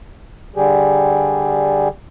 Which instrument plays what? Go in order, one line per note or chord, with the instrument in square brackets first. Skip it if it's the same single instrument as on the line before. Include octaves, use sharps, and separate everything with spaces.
[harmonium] D3 G3 G4 G#4